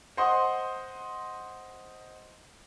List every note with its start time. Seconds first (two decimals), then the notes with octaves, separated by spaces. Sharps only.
0.17 C5 D#5 F#5 C6 D#6